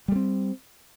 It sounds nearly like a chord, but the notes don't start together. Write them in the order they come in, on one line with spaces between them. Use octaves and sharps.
G3 A3 C4